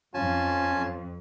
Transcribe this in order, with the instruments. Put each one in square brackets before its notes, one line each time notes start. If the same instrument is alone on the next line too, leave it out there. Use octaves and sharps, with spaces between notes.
[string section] F2 [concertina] C#4 G#5 A5 [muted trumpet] F4